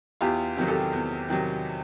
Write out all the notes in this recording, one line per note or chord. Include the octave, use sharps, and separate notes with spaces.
E2 F4 G4
C3 D#3 F#3
G4 A4
E2
C3 D#3 F#3